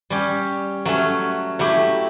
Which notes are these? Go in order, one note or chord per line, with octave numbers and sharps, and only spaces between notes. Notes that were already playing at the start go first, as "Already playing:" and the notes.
G3 C#4 G4
F#3 A3 C#4
F#3 A3 E4 G4